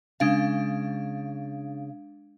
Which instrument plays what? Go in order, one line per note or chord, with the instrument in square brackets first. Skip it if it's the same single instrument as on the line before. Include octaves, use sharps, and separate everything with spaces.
[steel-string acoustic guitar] C#3 [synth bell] G#3 D4 F5